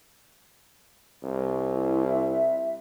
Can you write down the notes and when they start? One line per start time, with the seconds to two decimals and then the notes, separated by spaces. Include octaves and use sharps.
1.24 C2
1.73 E4
2.07 E5